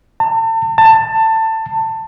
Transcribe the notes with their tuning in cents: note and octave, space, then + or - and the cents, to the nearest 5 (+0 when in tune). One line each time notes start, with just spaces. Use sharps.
A5 +40
A5 +20